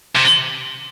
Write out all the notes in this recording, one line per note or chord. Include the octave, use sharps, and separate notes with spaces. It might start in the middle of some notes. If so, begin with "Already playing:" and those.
C3